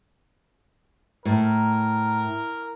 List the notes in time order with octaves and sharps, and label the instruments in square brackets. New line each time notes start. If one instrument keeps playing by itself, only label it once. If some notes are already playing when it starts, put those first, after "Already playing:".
[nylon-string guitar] A2 [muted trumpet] A#4